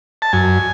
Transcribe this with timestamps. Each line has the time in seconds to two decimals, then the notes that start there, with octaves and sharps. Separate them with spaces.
0.22 A5
0.33 F#2 G#5